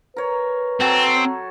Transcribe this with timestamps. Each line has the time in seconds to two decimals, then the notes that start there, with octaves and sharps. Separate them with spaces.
0.17 A#4 B4 C#5
0.80 F#3 C4 A4 G#5